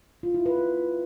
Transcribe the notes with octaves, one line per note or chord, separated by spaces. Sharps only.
F4
E4
B4